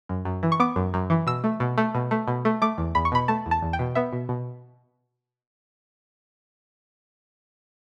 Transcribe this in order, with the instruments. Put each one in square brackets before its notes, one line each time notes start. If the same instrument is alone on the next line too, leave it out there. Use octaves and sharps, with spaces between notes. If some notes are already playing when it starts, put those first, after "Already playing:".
[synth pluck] F#2
F#2
E3
C#6
B3 D6
F#2
F#2
E3
B2 E6
A3
B2
A3
B2
A3
B2
A3
A3 D6
E2
E2 B5
C#6
B2 B5
A3 A5
E2
A5
E2
G5
B2
B3 E5
B2
B2